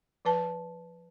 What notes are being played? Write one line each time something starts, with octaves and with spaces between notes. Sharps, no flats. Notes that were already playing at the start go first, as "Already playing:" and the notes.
F3 B4 A5